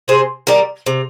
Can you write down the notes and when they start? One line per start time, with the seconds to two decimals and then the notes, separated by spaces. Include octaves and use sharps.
0.08 C3 G#4 C5
0.47 D#3 G3 G4 A#4
0.86 C3